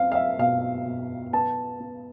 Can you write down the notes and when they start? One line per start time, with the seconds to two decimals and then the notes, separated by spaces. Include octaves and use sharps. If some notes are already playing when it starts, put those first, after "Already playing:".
Already playing: C4 F5
0.12 F5
0.15 E5
0.38 B2 F5
0.85 B2
1.33 B3 A5
1.80 B3